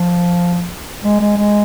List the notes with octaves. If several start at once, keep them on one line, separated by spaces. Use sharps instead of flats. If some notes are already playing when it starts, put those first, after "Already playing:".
Already playing: F3
G#3
G#3
G#3